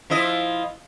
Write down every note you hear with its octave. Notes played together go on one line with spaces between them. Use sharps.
F3 E4 D#5